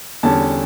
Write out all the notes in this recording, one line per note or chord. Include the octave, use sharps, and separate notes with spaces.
E2 D3 G3 C#4 A5